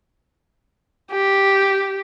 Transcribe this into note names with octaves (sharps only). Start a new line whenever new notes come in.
G4